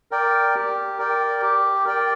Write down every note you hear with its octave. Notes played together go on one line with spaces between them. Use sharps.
A#4 D5 G5
G4
A#4 D5 G5
G4
A#4 D5 G5